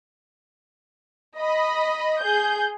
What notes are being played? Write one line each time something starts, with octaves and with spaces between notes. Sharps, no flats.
D#5 B5
G#4 G6